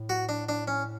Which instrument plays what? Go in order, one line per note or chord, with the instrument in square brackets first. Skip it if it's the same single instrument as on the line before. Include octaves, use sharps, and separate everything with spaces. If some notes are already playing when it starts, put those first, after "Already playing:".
Already playing: [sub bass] A2
[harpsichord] F#4
D4
D4
C#4